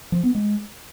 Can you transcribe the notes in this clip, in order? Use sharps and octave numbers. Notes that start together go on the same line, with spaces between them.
F3
B3
G#3